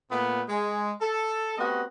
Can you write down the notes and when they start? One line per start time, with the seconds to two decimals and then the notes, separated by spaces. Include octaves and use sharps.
0.11 A#2 A3 B3
0.49 G#3
1.01 A4
1.58 A3 B3 C4 F#4 G4 D#5